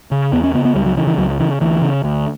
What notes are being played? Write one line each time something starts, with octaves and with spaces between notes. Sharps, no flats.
C#3
E2 B3
C#4
C#3 B3
B3
C#2 G3
F#3
C#3 E3
E3
C#2 F#3
C#3 E3
D2 E3
C#3
D2